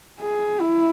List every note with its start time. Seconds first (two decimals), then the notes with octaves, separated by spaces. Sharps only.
0.21 G#4
0.61 E4